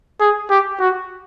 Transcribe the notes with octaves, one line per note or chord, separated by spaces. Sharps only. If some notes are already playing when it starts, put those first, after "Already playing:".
G#4
G4
F#4